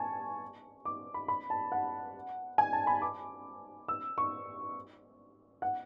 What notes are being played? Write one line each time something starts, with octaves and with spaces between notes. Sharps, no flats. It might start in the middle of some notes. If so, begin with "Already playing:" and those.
Already playing: G#5 A5 C#6
D6
B5
B5
A5
F#5
G#5
A5
B5
D6
E6
C#6
F#5